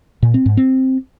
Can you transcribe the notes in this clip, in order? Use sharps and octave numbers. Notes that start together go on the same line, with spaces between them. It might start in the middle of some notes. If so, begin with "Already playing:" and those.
A#2
C4
G#2
C4